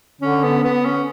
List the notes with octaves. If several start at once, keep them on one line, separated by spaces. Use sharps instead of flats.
D3 C#4
B3
B3
C#4